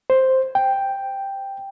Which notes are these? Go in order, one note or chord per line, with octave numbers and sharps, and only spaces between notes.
C5
G5